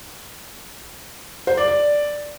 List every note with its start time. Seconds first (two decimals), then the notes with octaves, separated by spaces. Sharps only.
1.47 C5
1.57 D5
1.68 D5